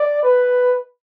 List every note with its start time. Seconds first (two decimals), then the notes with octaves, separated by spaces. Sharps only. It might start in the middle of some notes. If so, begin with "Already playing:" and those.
Already playing: D5
0.23 B4